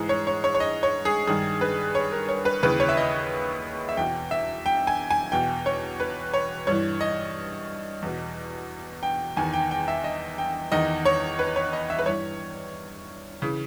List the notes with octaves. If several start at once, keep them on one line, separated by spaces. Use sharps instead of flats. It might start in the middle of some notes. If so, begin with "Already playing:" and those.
Already playing: G#2 E3 G#4
C#5
C#5
C#5
C#5
D#5
C#5
G#4
G2 D#3 G#4
B4
C#5
A#4
C#5
B4
D#2 C#3 E3 B4
C#5
E5
D#5
E5
E2 B2 G5
E5
G5
G#5
G#5
E2 B2 G5
C#5
B4
C#5
G2 E3 C#5
D#5
E2 B2
G5
E2 D#3 G#5
G5
G5
E5
D#5
G5
E2 D#3 D#5
C#5
B4
C#5
D#5
E5
B4
G2 E3 C#5
C#3 E3